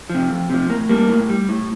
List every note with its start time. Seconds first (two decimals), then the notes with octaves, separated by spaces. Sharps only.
0.09 C3 F3
0.29 F2
0.50 C3 F3
0.69 A2 A#3
0.89 G3 A#3
1.09 A2
1.29 G3
1.49 A2